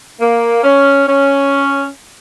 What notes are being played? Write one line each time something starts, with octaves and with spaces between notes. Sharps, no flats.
A#3
C#4
C#4